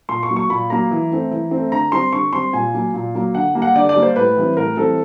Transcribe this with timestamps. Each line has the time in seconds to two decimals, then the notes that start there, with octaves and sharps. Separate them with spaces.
0.09 A#2 C6
0.23 C#6
0.29 F#3 A#3
0.36 C#6
0.50 A#2 B5
0.70 F#3 A#3 A#5
0.91 E3
1.11 A3 C4
1.31 E3
1.51 A3 C4
1.72 D3 A#5
1.92 G3 C4 C6
2.13 D3 C#6
2.33 G3 C4 C6
2.53 A#2 G#5
2.74 F#3 A#3
2.94 A#2
3.14 F#3 A#3
3.35 D3 F#5
3.55 G3 A#3
3.62 F#5
3.75 D3 D5
3.89 D5
3.95 G3 A#3
4.03 C5
4.16 A2 B4
4.37 E3 G3 C4
4.57 A2 A#4
4.77 E3 G3 C4 A4